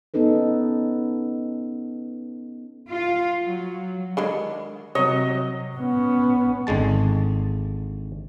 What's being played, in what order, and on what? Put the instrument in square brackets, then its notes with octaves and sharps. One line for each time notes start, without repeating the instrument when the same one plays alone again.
[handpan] B3 C#4 D#4 A4 B4
[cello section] F4
F#3
[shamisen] D3 D#3 G#3
[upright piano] C3 F#3 [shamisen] C#5 [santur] D#5
[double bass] B3 C#4
[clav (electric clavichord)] G#1 D3 G#3 A5